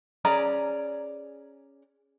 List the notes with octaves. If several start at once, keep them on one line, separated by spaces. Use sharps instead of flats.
C#4 G#4 D5 A#5